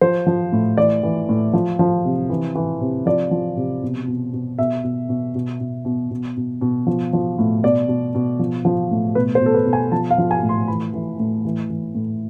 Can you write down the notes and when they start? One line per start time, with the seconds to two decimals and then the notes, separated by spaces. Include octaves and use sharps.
0.01 F3 C5
0.27 F3
0.52 A2
0.78 E3 D5
1.03 E3
1.29 A2
1.53 F3
1.79 F3
2.05 C3
2.30 E3
2.55 E3
2.81 C3
3.06 F3 D5
3.31 F3
3.57 C3
3.83 B2
4.07 B2
4.33 B2
4.59 B2 E5
4.84 B2
5.09 B2
5.35 B2
5.60 B2
5.85 B2
6.11 B2
6.37 B2
6.61 B2
6.87 F3
7.13 F3
7.38 A2
7.63 B2 D5
7.88 B2
8.15 B2
8.39 F3
8.65 F3
8.91 A2
9.15 B2 B4
9.35 C5
9.41 B2 A4
9.54 B4
9.66 B2
9.73 G#5
9.92 F3 A5
10.11 F5
10.18 F3
10.31 G#5
10.43 A2
10.49 C6
10.68 E3 B5
10.94 E3
11.19 A2
11.45 E3
11.70 E3
11.95 A2